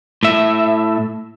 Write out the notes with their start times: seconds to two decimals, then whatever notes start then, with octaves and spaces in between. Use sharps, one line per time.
0.23 A2 E5